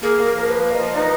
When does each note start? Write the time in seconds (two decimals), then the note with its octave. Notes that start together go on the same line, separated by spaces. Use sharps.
0.02 A#3 G#4
0.18 A#3
0.25 A#4
0.34 F3
0.48 A#3 B4
0.63 A#3
0.71 F5
0.75 F3 D#5
0.94 D#4 B4 D5